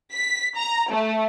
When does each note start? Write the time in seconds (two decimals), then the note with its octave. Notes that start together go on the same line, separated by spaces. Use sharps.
0.12 B6
0.56 A#5
0.92 A3